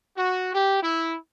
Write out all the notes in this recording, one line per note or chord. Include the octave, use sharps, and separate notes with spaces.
F#4
G4
E4